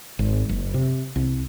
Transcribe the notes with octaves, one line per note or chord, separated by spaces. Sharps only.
G#1
F#1
C3
C2